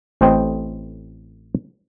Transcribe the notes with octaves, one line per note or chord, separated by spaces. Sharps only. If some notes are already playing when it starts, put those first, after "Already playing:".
A1 A2 C4 C5 D#5 G5